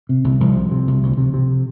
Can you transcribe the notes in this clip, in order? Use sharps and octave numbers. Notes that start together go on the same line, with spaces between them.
C3
C2
C2 F3
C3
C3
C2
D2
C3
C3